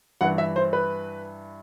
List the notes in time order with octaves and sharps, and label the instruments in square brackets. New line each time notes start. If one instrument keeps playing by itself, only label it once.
[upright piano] G2 E3 F#5
E5
C5
B4